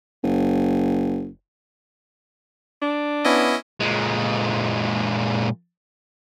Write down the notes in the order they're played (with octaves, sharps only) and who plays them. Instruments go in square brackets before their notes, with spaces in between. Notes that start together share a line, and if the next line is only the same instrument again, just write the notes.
[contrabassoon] F#1
[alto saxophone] D4
[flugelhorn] B3 [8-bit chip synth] C#4 E4 D#5
[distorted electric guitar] A#2 G#3